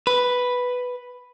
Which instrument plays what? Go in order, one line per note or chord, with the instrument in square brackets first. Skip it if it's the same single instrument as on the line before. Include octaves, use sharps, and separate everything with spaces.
[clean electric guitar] B4